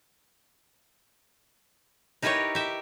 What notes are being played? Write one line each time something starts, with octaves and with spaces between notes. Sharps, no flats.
D#4 E4 G4 A#4 B4 C#5
G4 E5